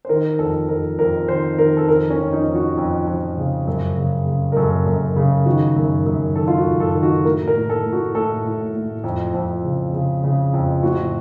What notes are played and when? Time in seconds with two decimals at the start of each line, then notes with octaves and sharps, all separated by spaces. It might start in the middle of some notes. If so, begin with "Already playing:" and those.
0.05 C5
0.09 D#3 A#4
0.39 F2 A4
0.69 F2 A#4
0.99 F2 A#4
1.28 D#3 C5
1.58 D#3 A#4
1.77 A4
1.88 F2 A#4
2.10 C#4
2.18 F2
2.33 D#4
2.48 F2
2.55 F#4
2.77 F2
3.07 F2
3.38 C#3
3.67 F#2
3.97 C#3
4.27 C#3
4.52 A#4
4.57 F#2 A4
4.87 F#2
5.16 C#3
5.46 D#3 F#4
5.76 F#2
6.06 F#2
6.36 D#3 A4
6.48 F4
6.58 F#4
6.65 F#2
6.80 A4
6.95 D#3
7.03 F#4
7.25 A2 A#4
7.48 A#4
7.55 A2
7.70 A4
7.85 A2
7.93 F#4
8.15 A2 A4
8.45 A2
8.74 A2
9.04 F2
9.34 F2
9.64 C#3
9.93 C#3
10.24 C#3
10.53 F2
10.83 A2 F#4